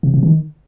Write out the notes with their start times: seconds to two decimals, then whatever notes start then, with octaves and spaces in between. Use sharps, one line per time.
0.03 C3
0.14 C3
0.23 D#3